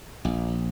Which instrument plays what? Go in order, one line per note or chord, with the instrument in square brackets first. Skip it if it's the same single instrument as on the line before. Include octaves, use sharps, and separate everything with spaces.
[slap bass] A#1